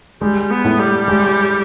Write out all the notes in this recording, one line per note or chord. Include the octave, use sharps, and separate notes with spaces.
G3 G#3
B3
A2
G3
G#3